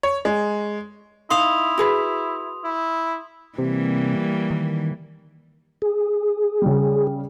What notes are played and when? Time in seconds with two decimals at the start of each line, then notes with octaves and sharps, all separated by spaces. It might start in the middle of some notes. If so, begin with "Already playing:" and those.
0.03 C#5
0.25 G#3
1.30 D#4 E4 F5 C6 D#6 F7
1.78 F#4 G#4 B4
2.64 E4
3.58 C3 E3 G3 A#3
4.50 D#3
5.82 G#4
6.62 C#3 G3